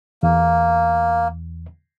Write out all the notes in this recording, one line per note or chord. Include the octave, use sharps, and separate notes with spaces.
E2 A#3